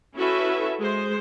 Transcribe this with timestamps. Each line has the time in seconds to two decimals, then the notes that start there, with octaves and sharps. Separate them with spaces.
0.16 C#4 E4 F#4 A4 B4 E5
0.80 G#3 C5